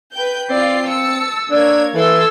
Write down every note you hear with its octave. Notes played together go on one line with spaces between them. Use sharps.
B4 G5 G6
C4 F4 D5 C7
A5 E6 C#7
A#3 D4 C#5 G#6
E3 A4 C6 E6 G#6